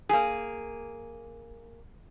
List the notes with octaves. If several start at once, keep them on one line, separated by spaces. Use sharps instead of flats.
A#3 G#4